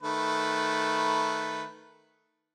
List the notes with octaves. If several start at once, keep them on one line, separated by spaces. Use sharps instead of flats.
D#3 A3 B4